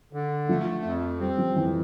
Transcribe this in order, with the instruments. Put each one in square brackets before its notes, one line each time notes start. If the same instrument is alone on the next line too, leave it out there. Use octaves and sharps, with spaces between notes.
[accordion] D3
[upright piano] F3 [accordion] A3
[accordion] F2
[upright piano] G3 [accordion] C4
[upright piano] F3
[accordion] F2 [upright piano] E3